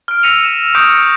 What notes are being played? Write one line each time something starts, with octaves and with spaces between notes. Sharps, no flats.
F6 D7
E6 A#6 B6 C#7 D#7 F7
E7
C#6 D#6 G6 A#6 C#7 D7
F7